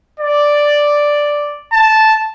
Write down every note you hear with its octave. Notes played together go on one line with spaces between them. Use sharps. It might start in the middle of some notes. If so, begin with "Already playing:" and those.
D5
A5